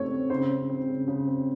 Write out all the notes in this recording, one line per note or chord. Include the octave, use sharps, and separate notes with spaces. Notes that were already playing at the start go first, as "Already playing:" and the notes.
Already playing: C#3 A3 C4 C#5
C4
C#3 C5
C#3
C4
C#3
C#3
C4